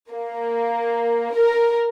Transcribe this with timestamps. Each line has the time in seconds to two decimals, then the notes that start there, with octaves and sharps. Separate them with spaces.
0.11 A#3
1.33 A#4